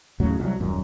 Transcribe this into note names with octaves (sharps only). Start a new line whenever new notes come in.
D#2 A2 C#3 F#3
C2 F#3
D#1 F#2